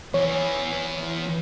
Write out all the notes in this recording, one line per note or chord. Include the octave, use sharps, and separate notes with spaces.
E2 C#5